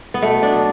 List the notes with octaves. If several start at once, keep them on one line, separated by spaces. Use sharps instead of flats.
B3
B2 A3
D4
F#3